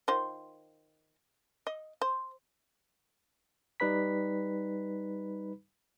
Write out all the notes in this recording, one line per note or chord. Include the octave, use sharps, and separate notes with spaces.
D#3 F4 C5
D#5
C5
G3 D#4 B4 B5 B6